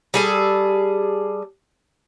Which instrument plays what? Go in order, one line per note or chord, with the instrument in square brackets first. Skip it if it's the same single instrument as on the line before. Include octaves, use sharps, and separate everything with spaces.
[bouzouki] G3 G#4 A4